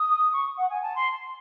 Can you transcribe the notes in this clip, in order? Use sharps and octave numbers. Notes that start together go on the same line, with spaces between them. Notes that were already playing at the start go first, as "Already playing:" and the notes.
Already playing: D#6
C#6
F#5
G#5
A5
C6